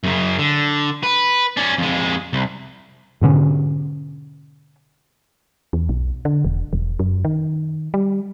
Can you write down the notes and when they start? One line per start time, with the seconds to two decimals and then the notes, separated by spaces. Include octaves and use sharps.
0.04 F#2 C#3
0.39 D3
1.03 B4
1.57 C#4 D5
1.78 F2 G#3
2.33 C2
3.21 G#2 B2 D3 C#4
5.73 E2
5.89 B1
6.25 D3
6.45 E1
6.73 E1
6.99 F#2
7.25 D#3
7.94 G3